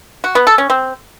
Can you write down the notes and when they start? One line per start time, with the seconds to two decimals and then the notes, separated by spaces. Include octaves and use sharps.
0.24 F#4
0.35 B3
0.47 A4
0.58 C#4
0.70 C4